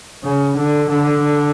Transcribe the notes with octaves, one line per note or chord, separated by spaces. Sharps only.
C#3
D3
D3